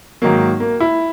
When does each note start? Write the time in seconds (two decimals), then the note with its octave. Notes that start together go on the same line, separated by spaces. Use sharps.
0.22 G#2 D#3 F#3 A#3
0.60 A#3
0.80 E4